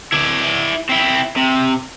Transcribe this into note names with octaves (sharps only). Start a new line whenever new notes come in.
E4 D5
C4 E4
C3